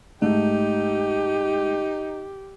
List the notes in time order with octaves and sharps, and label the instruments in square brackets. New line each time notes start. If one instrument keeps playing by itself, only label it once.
[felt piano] G#2 A3 [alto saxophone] D#4 [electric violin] G4